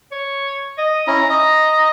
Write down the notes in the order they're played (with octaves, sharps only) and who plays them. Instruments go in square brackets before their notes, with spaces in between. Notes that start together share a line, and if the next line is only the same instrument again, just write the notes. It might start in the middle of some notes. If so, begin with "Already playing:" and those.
[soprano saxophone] C#5
D#5
[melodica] C#4 E4 [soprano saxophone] A#5
[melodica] D#5 [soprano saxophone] A#5